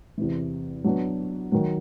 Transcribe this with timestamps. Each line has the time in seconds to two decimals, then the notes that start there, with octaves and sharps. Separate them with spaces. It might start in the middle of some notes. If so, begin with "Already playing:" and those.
0.18 E2 C3 E3
0.84 F#3 B3 D4 F#4
1.52 D#3 F#3